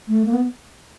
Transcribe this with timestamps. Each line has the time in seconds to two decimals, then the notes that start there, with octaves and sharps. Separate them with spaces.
0.08 A3
0.26 A#3
0.34 B3